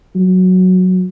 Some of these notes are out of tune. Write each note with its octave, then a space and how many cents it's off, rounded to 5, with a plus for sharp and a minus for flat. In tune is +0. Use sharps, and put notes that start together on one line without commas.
F#3 -5